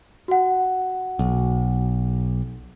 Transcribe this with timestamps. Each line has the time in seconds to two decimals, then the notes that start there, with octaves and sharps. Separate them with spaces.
0.28 F#4 F#5
1.19 B1